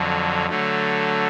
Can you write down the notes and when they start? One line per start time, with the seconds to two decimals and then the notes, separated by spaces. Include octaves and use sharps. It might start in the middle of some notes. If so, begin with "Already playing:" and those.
Already playing: F2 D3 F#3
0.49 D3 F#3 A3